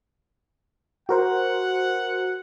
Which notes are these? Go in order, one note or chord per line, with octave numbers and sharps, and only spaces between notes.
F#4 A#4 C5 F#5